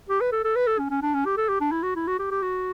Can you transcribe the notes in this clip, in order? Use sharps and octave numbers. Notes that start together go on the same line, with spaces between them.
G4
B4
A4
A4
B4
A4
C#4
C#4
D4
C#4
G4
A4
G4
D4
E4
F#4
E4
F#4
G4
G4
F#4